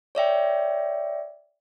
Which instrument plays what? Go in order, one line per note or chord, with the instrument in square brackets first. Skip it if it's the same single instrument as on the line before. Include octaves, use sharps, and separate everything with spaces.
[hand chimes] C#5 D5 E5 G5